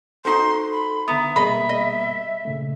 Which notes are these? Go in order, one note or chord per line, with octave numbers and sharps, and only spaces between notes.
D#4 F#4 A4 C5 C6
B5
D3 B3 E5 A#5 D#6
B2 G3 A#3 G#4 D#5 B5
D#5
A#2 C#3 A3